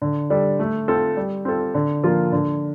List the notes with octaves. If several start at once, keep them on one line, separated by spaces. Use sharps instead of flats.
D3
G3 D4 A4
A3
C4 F4 A4
G3
C4 F4 A4
D3
F3 A#3 F4
D3